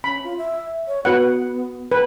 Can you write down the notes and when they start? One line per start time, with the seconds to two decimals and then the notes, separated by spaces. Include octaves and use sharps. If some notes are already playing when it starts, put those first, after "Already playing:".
0.04 C#4 B5
0.24 F4
0.38 E5
0.87 C#5
1.05 B3 F#4 B4 F#5
1.92 B4